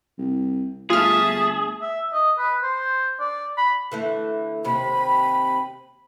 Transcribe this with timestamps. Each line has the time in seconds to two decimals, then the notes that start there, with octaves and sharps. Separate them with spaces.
0.18 C2
0.90 G1 A3 F4 G#4 E5 A5 F6
1.82 E5
2.13 D#5
2.38 B4
2.62 C5
3.20 D5
3.57 B5
3.91 D3 E3 A3
4.64 D#2 C3 B5